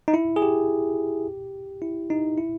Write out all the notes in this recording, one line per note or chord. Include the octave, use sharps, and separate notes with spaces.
D#4
E4
G#4
G4
E4
D#4
E4